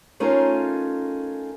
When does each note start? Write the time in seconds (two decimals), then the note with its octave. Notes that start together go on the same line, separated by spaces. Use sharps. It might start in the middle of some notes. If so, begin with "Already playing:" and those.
0.20 A3 C#4 D#4 F4 G#4 A#4